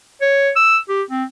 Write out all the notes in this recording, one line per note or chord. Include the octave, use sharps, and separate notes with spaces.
C#5
E6
G4
C4